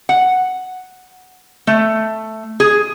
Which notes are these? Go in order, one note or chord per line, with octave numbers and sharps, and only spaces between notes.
F#5
A3
G#4